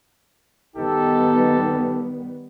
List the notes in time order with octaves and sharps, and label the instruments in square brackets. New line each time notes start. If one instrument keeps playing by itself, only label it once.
[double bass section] D#3 G3 B3 [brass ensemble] D#4 G4 A4